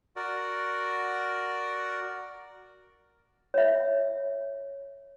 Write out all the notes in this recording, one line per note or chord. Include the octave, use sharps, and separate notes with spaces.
F#4 A#4 D5
C#5 E5